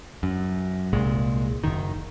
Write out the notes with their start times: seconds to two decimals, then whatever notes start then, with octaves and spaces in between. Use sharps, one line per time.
0.23 F#2
0.93 C2 A#2 G#3
1.64 F#1 D#3